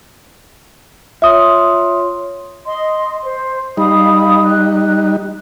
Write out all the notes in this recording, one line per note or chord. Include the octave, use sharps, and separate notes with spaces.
F4 C#5 E5 C6 D#6
D#5 C6
C5
G3 D#4 F5 B5 D#6
F#6